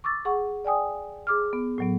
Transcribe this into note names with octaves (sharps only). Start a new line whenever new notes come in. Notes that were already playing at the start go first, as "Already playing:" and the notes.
C#6 D6 E6 A6
G#4 F#5 C#6
D5 G5 G#5 D#6
G#4 D6 F6
B3
A2 F#3 B3